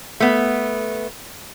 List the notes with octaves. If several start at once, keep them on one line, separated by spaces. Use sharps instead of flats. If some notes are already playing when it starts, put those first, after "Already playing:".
A3 B3